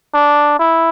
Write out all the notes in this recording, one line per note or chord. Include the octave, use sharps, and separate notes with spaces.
D4
E4